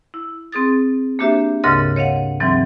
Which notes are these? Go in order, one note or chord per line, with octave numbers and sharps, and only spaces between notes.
E4
C4 G#4 D#6 A6
A#3 D4 F#4 G4 C5 E5
D2 G#2 C#3 A#4 D#5 A6
C#5 D#5 F5 F#5
D#2 G#2 E3 F#3 C4